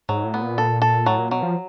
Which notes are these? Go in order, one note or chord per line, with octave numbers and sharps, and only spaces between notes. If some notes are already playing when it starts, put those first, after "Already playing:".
G#2 F#3
A2
B3
A#2
A4
A4
A2 F#3
A#2
B2 F#3
F3